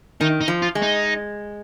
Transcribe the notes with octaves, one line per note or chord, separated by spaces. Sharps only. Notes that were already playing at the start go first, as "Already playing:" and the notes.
D#3 D#4
D#4
F3
F4
G#3
D#4